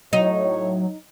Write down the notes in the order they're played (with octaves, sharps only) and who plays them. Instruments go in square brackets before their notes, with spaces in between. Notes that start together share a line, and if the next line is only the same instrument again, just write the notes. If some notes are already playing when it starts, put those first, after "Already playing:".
[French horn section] A2 C#5 [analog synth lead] F#3 [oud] D#4